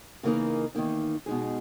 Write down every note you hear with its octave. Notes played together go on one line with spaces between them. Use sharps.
C#3 E3 A#3 D#4 A#4
E2 D#3 A#3 D#4
B2 G#3 D#4 G#4